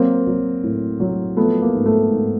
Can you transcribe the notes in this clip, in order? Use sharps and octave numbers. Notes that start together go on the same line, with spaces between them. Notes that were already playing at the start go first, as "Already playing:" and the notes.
Already playing: F#3 A#3 C4
F#3
A2
F#3
F3 A3 B3
A#3
G#2
A3
G#2